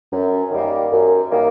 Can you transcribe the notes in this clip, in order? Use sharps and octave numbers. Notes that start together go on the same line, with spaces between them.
F#2
D#3 G3 A#3
F#2
D#3 G3 A#3